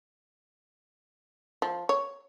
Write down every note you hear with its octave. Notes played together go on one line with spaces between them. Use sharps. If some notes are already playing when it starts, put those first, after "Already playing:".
F3
C#5